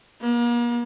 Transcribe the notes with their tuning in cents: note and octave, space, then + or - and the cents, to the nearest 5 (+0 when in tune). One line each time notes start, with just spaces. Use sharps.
A#3 +40